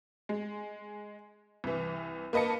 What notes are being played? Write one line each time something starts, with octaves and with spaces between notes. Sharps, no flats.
G#3
C2 E3
A#3 B4 D#5 A5 C#7